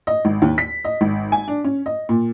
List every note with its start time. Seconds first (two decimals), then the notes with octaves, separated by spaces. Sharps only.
0.07 D#5
0.25 G#1
0.42 D#2
0.58 B6
0.85 D#5
1.01 G#1
1.32 G#5
1.48 D4
1.64 C#4
1.86 D#5
2.09 A#2